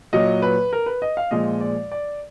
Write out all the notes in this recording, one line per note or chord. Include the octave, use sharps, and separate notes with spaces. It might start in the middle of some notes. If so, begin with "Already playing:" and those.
A#2 F#3 D#5
B4
A#4
B4
D#5
F5
A#2 F3 G#3 D#5
D5
D5